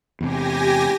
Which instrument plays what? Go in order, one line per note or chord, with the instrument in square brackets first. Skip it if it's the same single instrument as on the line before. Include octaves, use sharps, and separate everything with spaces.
[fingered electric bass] E2 C3 [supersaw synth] G4 G#5 A#6